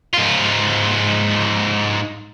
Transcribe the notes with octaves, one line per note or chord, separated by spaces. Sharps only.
G#2 F4